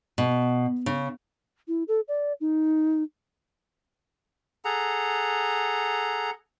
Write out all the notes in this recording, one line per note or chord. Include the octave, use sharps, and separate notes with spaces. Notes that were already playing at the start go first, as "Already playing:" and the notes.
B2
C#3
E4
A4
D5
D#4
G#4 A4 F#5 A#5